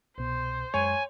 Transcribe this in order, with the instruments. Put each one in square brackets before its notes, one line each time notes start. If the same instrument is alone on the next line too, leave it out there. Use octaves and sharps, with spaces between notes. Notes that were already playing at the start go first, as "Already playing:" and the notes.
[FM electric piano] C2 B2 [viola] C5
[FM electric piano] F#2 G#3 [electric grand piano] C#5 [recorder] G#5